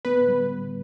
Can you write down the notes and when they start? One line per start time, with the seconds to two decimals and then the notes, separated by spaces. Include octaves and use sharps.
0.05 B3 B4
0.28 G3